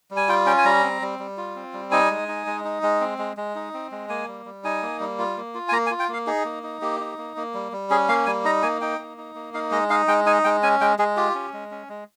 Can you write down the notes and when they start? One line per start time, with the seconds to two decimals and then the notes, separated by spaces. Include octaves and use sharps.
0.11 G3
0.17 G#5
0.28 F4 G5
0.46 C#4 G5
0.58 G#5
0.65 G3 A#5
0.83 C4
1.02 G3
1.19 G3
1.37 F4
1.56 C4
1.73 G3
1.91 D#4 G#5
2.10 G#3
2.28 D#4
2.46 G#3
2.64 D#4
2.83 G#3
3.00 C4
3.18 G#3
3.37 G#3
3.55 D#4
3.74 C4
3.92 G#3
4.09 A#3 G#5
4.28 G3
4.46 G3
4.64 D#4 G#5
4.83 A#3
5.00 G3
5.19 F4
5.37 A#3
5.55 F4
5.69 G#5
5.72 A#3 A#5
5.86 G#5
5.91 F4
6.00 G5
6.09 A#3 F5
6.27 D#4 G#4
6.45 A#3
6.63 D#4
6.82 A#3 G4
7.00 D#4
7.18 A#3
7.37 A#3
7.54 G3
7.72 G3
7.90 C#4 G#4
8.08 A#3 F5
8.26 G3 G#5
8.45 D#4 A#5
8.62 A#3 G#5
8.81 D#4 G5
8.99 A#3
9.17 D#4
9.35 A#3
9.54 D#4 F5
9.71 G#3 D#5
9.90 D#4 F5
10.08 G#3 G5
10.26 D#4 G#5
10.44 G#3 G5
10.63 C#4 G#5
10.81 G#3 G5
10.99 G#3 G#4
11.17 F4 G4
11.35 C#4
11.53 G#3
11.71 C#4
11.89 G#3